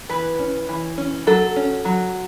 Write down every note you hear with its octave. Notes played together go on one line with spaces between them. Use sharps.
E3 B4
C#4
E3
C#4
F#3 A4
C#4
F#3